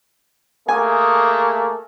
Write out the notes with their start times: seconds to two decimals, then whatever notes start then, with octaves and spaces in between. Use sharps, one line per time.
0.68 A3 A#3 G#4 G#5